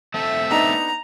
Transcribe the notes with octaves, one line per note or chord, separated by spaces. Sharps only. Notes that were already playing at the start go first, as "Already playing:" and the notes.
A3 C4 A4 E5
B3 D4 D#4 A#5